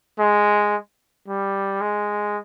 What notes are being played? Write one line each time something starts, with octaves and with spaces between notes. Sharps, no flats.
G#3
G3
G#3